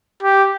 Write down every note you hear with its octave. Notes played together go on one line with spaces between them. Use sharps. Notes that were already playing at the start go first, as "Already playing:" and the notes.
G4